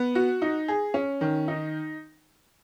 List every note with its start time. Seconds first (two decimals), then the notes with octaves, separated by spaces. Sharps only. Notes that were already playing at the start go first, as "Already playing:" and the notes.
Already playing: B3
0.15 F#4
0.42 D#4
0.68 G#4
0.94 C#4
1.21 D#3
1.48 D#4